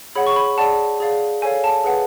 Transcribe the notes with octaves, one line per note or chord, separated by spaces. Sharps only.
G#4 C#5 F#5 B5
C#6
B5
G#4 D5 F#5 A5
G#4 D5 F5
A4 C#5 F5 G#5
A5
G#4 B4 F#5